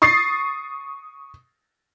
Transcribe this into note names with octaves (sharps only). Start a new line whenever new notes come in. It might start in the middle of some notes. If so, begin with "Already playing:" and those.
C#6 D#6 A6 C7